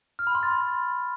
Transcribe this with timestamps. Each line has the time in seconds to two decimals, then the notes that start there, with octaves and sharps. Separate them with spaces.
0.19 F6
0.27 B5
0.35 C6
0.43 A6